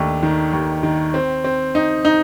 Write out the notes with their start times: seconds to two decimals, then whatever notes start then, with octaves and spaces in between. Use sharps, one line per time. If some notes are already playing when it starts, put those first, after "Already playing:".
Already playing: D#2 A3 D4
0.23 D#3
0.53 D#2
0.83 D#3
1.14 C4
1.44 C4
1.75 D#4
2.05 D#4